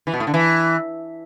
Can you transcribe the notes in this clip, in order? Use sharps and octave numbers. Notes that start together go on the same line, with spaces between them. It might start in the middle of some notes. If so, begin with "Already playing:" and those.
E3
B2
A2
D3
E3